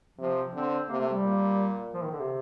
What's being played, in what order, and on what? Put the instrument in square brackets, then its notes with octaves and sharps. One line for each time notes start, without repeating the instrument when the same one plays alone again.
[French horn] C3 [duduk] F3
[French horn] D3 [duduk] C4
[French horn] C3 [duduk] A#3
[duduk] A3
G3
[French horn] A#2
[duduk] F3
D#3
D3
C3